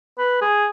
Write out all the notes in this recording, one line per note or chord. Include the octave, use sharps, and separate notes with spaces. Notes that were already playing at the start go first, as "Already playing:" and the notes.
B4
G#4